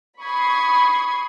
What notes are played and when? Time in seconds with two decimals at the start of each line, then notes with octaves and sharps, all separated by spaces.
0.21 B5 C#6 D#6 G#6 C7